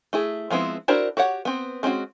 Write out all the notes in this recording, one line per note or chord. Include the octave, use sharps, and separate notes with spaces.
A3 E4 G#4
F3 G#3 B3 C4 E4
D4 E4 F#4 A#4 C5
F#4 G4 C#5 F#5
B3 C4
G#3 C4 C#4 F4 F#4